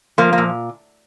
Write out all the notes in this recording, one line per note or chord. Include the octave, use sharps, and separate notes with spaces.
F3 A#3
A#3
A#2